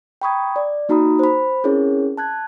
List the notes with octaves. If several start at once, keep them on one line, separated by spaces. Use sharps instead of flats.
G5 A#5 B5 C#6 D#6 G#6
D5
A#3 D#4 F#4 A#5 B5 D#6
C5 B5
C4 C#4 E4 G#4 A#4 C#5
A5 F#6 G#6